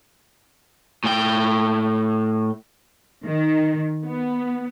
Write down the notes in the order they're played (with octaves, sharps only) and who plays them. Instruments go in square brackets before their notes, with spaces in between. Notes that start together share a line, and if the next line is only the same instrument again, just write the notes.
[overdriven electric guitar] A2 G5
[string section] D#3
B3